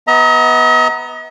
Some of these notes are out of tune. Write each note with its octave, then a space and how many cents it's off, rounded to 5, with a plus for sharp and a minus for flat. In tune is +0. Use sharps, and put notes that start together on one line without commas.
B3 +0 D#5 +45 A#5 +0